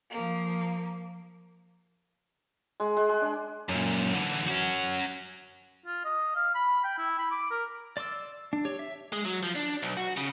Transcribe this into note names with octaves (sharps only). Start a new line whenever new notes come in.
F3 A#3
G#3
G#3
G#3
D4
F#2 A#2
D3 E3
C#4 F#4
F4
D#5
F5
B5
G5
E4
B5
D6
A#4
D5 C6 D6 E6
D4
G4 C#5
E5
G#3
F#3
F3
D4
B1
F#4
C#3